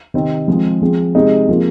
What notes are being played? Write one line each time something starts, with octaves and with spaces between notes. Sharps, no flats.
C3 D#3 C4 D#4
F3 G#3 C4 G#4
F3 C4 G#4
C3 G#3 D#4 G#4
C3 F3 A#3 F4 G#4